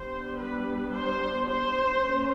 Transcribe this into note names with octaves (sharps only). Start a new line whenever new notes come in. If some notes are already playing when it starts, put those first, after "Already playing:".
Already playing: G3 B3 D4 C5
B4
C5
C5
A#3 C#4